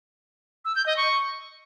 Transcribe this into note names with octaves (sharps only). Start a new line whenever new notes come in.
E6
G6
D#5
C#6